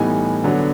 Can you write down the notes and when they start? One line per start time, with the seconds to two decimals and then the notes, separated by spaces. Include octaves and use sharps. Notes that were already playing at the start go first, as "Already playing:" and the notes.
Already playing: A2 E3 G3 B3 D#4 G#5
0.44 D3 F#3 B3 D4